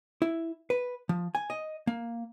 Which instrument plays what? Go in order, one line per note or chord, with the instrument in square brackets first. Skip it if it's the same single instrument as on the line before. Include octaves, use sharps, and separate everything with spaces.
[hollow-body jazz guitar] E4
B4
F3
G#5
D#5
A#3